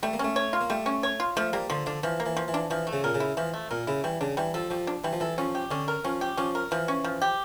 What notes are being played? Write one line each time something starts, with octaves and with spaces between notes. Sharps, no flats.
G3 A3
A#3
A3 C#4
C#5
F4
A#3
G3 A3
C#4
C#5
F4
F3 A3
G3 A#3
D3 F3
D3 D4
E3 F3
A#3
E3
F3
E3
D4
E3 F3
A3
C#3
A#2 A#4
C#3
E4
E3 F3
A3
A#2 A#4
C#3 E4
E3 G3
C#3 D4
E3 G3
F3 A4
F3 G3
D4
E3 G3
F3
E3 A4
F3 C#4
G4
D3 C#4
A#4
F3 C#4
G4
F3 C#4
A#4
E3 F3
C#4
F3
G4